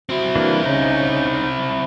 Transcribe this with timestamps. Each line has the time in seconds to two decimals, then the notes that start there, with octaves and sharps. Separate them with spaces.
0.09 C4 E4 F#4
0.35 E3 A#3 D4
0.65 C#3 D#4